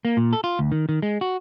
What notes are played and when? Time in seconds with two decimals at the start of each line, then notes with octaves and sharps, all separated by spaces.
0.05 A#3
0.17 A#2
0.33 A4
0.44 F4
0.59 D2
0.72 D#3
0.89 D#3
1.02 G#3
1.21 F#4